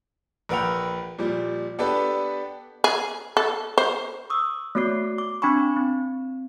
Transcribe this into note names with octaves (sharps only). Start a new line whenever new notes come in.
A#1 A#4 B4 F#5 G5 F7
A#2 F3 G3
B3 D4 G4 A4 B4
G#4
A4
C5
C#6 D#6 E6
A3 B3 F#4 C#5 D6 C7
D6
C4 D4 G#5 B5 C#6
C4